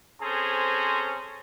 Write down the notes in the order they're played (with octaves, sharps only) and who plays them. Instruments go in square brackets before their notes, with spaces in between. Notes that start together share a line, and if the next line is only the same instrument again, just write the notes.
[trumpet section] C4 C#4 G#4 A4 C5 A#5